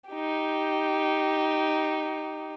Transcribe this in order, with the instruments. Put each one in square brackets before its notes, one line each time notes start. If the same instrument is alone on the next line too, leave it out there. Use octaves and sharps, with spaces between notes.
[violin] D#4 G4